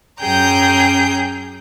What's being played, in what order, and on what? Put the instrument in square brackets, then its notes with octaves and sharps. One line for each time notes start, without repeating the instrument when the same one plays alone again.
[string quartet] F#2 C#4 G#4 G5 A#5 G6